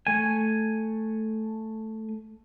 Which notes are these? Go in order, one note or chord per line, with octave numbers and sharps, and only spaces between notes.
A3 G#5